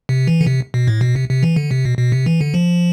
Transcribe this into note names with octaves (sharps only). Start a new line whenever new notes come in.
C3
E3
D3
C3
B2
A2
B2
C3
C3
E3
D3
C3
B2
B2
C3
E3
D3
F3